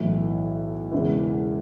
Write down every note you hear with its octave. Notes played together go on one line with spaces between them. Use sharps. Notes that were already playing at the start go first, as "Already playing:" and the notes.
Already playing: B1 A2 E3
E1 E2 C#3 E3